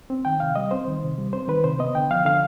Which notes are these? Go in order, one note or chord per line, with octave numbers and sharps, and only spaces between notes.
C4
D#3 G5
C3 F5
G3 D#5
C4 C5
D#3
C3
G3
C4 C5
D#3 B4
C3 C5
B3 D#5
D3 G5
F3 F5
D3 F5